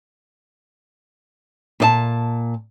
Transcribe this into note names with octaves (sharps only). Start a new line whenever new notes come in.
A#2 D5 A5